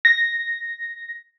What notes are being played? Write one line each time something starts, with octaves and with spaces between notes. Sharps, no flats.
A#6